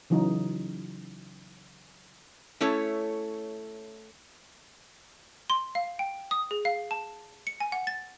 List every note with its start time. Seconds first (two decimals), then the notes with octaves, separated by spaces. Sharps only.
0.10 C#3 E3 F#3 D#4
2.61 A3 C#4 E4 A4 C#5
5.50 C6
5.75 F5
5.99 G5
6.31 D#6
6.51 G#4
6.65 F5
6.91 A5
7.47 C#7
7.60 G#5
7.72 F#5
7.87 A6